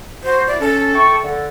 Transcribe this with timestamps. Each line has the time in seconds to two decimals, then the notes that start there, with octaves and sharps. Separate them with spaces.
0.24 F#4 C5
0.47 E4 D5
0.60 C#4 A4
0.94 E4 G5 C#6
1.23 D3 A4